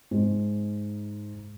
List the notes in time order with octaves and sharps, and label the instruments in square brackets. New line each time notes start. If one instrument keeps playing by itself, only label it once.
[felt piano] G#2